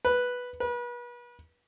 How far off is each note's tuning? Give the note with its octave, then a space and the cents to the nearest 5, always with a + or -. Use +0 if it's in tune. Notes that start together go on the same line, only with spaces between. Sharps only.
B4 -5
B4 -35